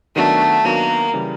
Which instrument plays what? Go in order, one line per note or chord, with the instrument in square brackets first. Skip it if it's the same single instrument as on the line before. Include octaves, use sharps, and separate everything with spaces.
[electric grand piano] D#3 F#3 B3 D4 F#4 [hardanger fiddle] A3
[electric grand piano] D#3 F#3 B3 D4 F#4 [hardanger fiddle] A#3
[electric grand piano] C#3 E3 G3